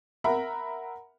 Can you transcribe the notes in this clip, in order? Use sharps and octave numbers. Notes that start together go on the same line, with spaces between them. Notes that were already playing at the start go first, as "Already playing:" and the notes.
A#4 E5 F#5 A#5 B5